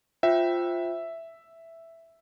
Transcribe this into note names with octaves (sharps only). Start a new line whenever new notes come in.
F4 C5 E5 G5